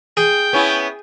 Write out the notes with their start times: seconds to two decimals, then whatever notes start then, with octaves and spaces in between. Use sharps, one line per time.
0.17 G#4 G5
0.53 B3 C#4 E4